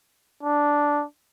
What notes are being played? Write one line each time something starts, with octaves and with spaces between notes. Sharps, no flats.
D4